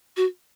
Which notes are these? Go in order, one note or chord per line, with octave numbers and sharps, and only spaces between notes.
F#4